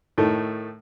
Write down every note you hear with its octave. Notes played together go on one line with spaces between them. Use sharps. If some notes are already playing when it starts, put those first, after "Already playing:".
A2 D#3 A3